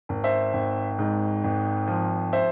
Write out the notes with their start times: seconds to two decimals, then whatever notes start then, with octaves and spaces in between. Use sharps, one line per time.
0.09 G#1
0.24 C5 E5
0.53 G#1
0.99 G#2
1.44 G#1
1.88 F3
2.33 C5 E5